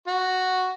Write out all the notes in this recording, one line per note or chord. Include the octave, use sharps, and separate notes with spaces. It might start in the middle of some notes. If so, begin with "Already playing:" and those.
F#4